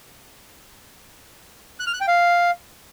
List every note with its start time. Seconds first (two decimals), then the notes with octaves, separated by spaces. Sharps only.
1.80 F#6
1.87 F6
1.94 F#6
2.01 G5
2.08 F5